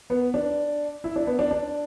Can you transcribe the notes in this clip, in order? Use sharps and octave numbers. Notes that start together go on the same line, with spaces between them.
B3
D4
E4
D4
B3
D4
D4